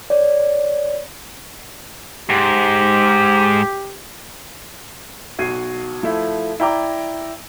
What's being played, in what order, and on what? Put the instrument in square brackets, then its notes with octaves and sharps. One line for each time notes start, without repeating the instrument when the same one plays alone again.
[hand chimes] C#5 D5
[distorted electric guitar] G#2 [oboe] G4
[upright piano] B1 F#4 G#6 C7 D#7
F3 A3 E4
E4 D5 G5 A#5 D6